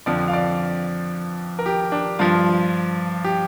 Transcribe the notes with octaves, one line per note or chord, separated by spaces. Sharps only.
F2 D3 F3 D5
F5
D5
A#4
G4
D4
G2 F3 F4
G4